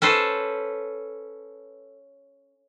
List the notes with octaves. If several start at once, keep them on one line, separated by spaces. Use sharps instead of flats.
C#4 A4 B4 C5